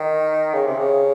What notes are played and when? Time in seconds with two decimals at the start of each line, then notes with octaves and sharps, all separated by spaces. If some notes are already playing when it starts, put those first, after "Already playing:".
Already playing: D#3
0.53 C#3
0.66 C3
0.79 C#3